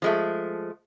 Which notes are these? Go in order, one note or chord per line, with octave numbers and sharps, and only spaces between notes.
F3 G#3 A3